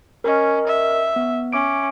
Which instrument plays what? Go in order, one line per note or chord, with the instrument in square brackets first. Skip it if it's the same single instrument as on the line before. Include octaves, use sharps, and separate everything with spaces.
[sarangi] C#4 [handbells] A#4 D#5
[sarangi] E5
[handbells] B3
[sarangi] C#4 [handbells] E5 D6 D7